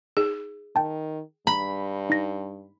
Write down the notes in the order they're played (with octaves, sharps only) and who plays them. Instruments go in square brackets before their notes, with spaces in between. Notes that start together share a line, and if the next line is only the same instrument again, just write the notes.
[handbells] D#4 [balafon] G#4
[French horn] D#3 [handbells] G5 A5
[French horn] G2 [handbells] A#5 [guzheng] B5
[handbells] D#4 A#6